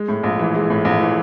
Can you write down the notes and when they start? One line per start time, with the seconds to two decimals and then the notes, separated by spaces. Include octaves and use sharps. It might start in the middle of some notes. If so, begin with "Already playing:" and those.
Already playing: G#3
0.08 A2
0.23 A#1
0.39 E3
0.55 G#3
0.70 A2
0.85 A#1
1.01 E3